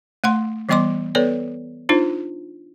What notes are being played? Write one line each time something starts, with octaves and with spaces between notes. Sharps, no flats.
A3 F#5 C6
E3 G3 B3 D#5 C6 D6
B3 A4 B4 C#5 D5
D4 D#4 F4 C5